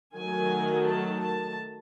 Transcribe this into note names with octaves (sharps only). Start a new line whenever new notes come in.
D#3 F#3 A3 G#5
A5
A5